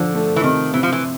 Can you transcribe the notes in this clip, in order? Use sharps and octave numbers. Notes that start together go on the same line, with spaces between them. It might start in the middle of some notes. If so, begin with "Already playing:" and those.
Already playing: D3 F3
A3
E3
C3 D#3
C3 E3
F3
E3